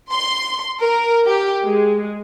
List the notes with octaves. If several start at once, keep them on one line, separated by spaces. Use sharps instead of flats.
C6
A#4
G4
G#3